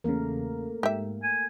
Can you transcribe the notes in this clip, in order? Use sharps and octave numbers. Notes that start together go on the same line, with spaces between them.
E2 C#3 A3 A#3 A#4
G#2 G4 E5
G#5